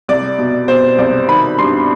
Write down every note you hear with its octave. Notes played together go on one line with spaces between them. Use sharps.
C2 D5
B2
B2 C5
C2 D5
D#3 B5
G2 C6